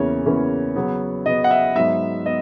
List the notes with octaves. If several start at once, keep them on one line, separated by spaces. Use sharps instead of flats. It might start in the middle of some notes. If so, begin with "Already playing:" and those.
Already playing: E2 C#3 E3 A#3 C#4 C#5
E2 C#3 E3 A#3 C#4
C#3 F#3 B3
C#3 F#3 B3 D#5
F#5
E5
G#2 F#3 B3 E5
B3 D#5